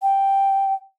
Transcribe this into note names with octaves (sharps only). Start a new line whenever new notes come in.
G5